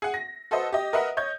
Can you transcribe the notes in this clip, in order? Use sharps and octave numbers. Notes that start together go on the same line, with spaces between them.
G#4 F#5
A#6
F#4 A4 B4 C5 D#5
G4 D#5
A#4 B4 D#5 E5 F#5
C#5 D#5 G6